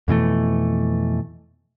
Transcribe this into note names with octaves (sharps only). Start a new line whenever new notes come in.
F2 B2 E3 A3